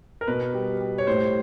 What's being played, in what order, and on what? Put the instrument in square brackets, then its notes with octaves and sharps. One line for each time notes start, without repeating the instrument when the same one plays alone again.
[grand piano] A#4
B2 B4
G3
G3
C#5
A2 C5